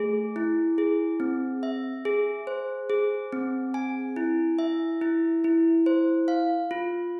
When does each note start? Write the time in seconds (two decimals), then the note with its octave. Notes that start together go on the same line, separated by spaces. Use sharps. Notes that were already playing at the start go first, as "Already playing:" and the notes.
Already playing: A3 G#4
0.36 E4
0.78 G#4
1.20 C4
1.63 E5
2.05 G#4
2.47 C5
2.90 G#4
3.32 C4
3.74 G#5
4.16 E4
4.59 E5
5.01 E4
5.44 E4
5.86 C5
6.28 F5
6.71 F4